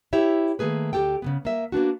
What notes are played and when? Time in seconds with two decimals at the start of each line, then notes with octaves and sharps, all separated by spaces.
0.13 E4 G4 C#5 E5
0.59 D#3 A3 A#3 G#4 B4
0.93 D2 C#3 G4 A4 G5
1.22 C#3 E3 B3
1.45 A#3 E5
1.72 A#3 B3 D4 F#4